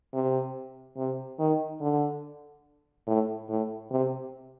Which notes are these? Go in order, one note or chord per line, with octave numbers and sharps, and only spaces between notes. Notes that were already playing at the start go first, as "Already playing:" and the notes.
C3
C3
D#3
D3
A2
A2
C3